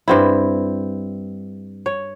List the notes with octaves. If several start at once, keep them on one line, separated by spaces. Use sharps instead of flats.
G2 C4 E4
C#5